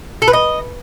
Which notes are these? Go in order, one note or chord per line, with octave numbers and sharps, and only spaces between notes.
A4
B4
D#5